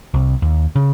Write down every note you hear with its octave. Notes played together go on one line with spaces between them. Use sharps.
C2
D#2
C#3